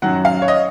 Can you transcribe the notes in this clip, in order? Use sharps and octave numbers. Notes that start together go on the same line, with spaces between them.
F#2 D#3 F#3 F#5
F5
C#5
D#5